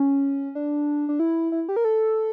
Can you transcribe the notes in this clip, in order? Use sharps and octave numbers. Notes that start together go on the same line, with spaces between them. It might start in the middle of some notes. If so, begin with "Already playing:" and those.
Already playing: C#4
D4
D4
E4
E4
G4
A#4
A4